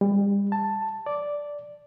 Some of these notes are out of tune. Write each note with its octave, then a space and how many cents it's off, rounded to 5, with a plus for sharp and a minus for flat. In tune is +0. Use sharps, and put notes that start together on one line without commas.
G3 +35
A5 +5
D5 -5